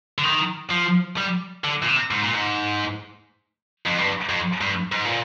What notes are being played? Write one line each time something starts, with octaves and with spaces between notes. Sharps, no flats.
D3
D#3
F3
G3
D3
A#2
C3
G#2
A#2
G#2
F2
G2
F2
G2
G#2
A#2